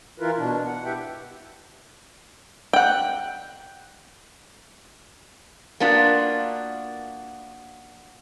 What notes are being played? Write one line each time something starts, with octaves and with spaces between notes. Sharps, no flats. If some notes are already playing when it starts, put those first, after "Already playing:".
E3 E4 F4 A#4 B4
B2 D4
F#5
E4 G4 B4 E5 G5
F#5 G5
A#3 B3 D4 F4 F#4